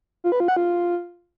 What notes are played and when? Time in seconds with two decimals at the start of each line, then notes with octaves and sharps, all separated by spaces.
0.24 F4
0.32 B4
0.40 F4
0.48 F#5
0.56 F4